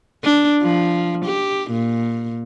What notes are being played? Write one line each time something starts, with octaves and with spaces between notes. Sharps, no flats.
D4
F3
G4
A#2